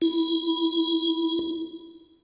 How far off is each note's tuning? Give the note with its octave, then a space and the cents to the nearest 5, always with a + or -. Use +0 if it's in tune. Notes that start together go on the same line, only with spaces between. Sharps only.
E4 -10